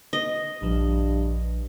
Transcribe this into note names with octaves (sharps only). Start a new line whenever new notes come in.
D#5
A#1 G2 F3